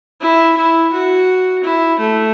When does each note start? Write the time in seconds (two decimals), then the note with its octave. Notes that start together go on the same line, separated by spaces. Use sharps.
0.21 E4
0.56 E4
0.93 F#4
1.64 E4
1.99 A3